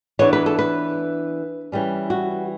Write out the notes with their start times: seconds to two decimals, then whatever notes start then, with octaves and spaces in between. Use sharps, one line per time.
0.19 E3 B3 D4 C#5
0.33 B4
0.46 A4
0.59 B4
1.72 E3 G3 C#4
2.10 F#4